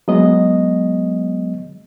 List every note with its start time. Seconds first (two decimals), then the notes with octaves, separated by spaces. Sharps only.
0.08 F#3 G#3 B3 D#5